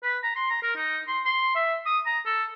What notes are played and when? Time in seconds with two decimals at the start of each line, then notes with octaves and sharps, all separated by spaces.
0.03 B4
0.23 A#5
0.36 C6
0.50 A#5
0.63 A#4
0.76 D#4
1.08 C6
1.25 C6
1.55 E5
1.86 D#6
2.06 A#5
2.26 A4